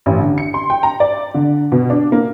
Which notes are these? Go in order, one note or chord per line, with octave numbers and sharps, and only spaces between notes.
A1
D3
C#7
C6
G5
A#5
D5
D3
B2
D4
A#3